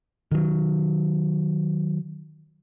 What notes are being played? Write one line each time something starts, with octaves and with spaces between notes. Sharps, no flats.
D#3 F#3